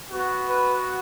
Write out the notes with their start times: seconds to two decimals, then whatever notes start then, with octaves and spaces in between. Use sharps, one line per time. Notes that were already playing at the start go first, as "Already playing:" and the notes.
0.11 B3 F#4
0.48 B4